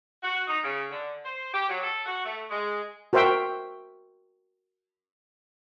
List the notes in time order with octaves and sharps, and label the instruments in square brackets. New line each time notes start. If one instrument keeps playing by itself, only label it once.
[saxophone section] F#4
D#4
C#3
D3
C5
G4
F#3
A4
F#4
A3
G#3
[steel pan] F#4 A#4 C5 E5 G5